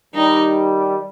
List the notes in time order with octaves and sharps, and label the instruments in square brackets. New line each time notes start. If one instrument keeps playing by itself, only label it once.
[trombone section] D#3 G3 [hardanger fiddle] D#4